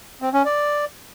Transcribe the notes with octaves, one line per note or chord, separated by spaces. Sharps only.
C4
C#4
D5